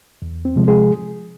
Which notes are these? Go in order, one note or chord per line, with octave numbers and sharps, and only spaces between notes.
E2
C4
C3 F3 G#3
G#3 G#4